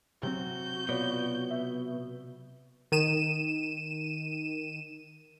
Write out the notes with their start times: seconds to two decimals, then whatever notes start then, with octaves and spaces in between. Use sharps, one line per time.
0.23 C3 F#3 C4 F#4 G6
0.89 B2 F4 C#5 D5
1.50 E5
2.92 D#3 D#7 E7